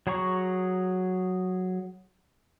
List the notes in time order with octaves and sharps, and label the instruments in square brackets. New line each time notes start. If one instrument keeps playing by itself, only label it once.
[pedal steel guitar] F#3 G#4 A#5 C#6